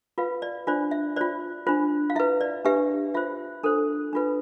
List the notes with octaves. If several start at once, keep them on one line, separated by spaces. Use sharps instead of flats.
F4 B4 F5
D5
D4 F4 C5 D5
E5
F4 C5 D5
D4 F4 C5
F5
E4 B4 E5
D5
D4 G4 B4 E5
F4 C5 E5
D4 A4 C5
D4 F4 B4